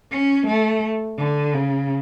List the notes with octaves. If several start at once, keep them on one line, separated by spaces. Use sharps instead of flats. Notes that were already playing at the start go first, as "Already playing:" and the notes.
C#4
A3
D3
C#3